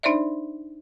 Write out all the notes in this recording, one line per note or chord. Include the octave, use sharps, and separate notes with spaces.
D4 D#4 C5 D5 E5